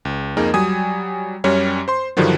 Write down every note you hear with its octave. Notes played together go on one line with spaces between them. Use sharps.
C#2
F2 A#3 D#4 G#4 A#4
F#3 G3 G#5 D#6 G#6
F#2 G3 C#4 C#5
C5 C6
G2 D3 D#3 F3 F#3